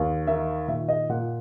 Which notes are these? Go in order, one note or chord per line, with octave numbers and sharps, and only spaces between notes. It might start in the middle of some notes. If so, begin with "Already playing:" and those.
Already playing: D#2
D#3 E5
A#2 E5
D#5
A#2 F#5